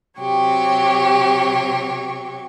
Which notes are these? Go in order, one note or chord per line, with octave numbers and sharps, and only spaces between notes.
C3 F#3 G4 C#6